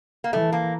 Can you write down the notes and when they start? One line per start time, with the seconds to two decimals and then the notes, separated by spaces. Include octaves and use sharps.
0.24 A#3
0.33 E3 A3
0.52 A#3